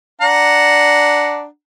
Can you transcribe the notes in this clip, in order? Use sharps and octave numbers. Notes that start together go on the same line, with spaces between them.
D4 F#5 A#5